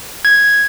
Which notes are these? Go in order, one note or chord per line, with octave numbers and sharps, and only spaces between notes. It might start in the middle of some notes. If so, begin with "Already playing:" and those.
G#6